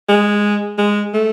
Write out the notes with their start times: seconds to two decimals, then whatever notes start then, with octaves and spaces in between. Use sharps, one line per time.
0.09 G#3
0.78 G#3
1.14 A3